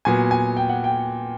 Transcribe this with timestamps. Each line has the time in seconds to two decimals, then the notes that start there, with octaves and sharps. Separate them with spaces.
0.05 A#2 F#3 B3 G#5
0.31 G#5
0.57 G5
0.69 F#5
0.84 G5